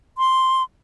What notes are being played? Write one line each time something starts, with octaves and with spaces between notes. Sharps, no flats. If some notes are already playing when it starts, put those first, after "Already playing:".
C6